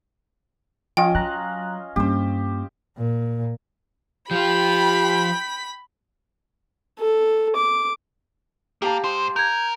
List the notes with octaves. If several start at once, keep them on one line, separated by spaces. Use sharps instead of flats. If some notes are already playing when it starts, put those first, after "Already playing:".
F3 C#4 F4 D#5 G5
F#3 A#5 F#6
G2 A#3 C#4 G4 C5
A#2
F3 F4 G4 G5 B5 B6
A4
D6
A#3 G4 A#4 F5 A5
G#2 C5 C6
A#4 G6 G#6